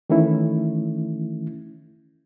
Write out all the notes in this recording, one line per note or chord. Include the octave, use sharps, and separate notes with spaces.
D#3 E3 A3 C#4 E4